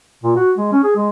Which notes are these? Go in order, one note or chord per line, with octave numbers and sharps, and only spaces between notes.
A#2
F#4
G#3
C#4
G#4
G#3